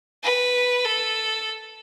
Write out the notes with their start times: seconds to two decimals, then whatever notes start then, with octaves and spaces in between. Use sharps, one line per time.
0.23 B4
0.85 A4